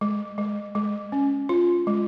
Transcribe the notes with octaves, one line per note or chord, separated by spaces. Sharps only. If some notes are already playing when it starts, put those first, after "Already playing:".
G#3
G#3
G#3
C#4
F4
G#3